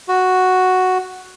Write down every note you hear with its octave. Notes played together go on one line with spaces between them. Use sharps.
F#4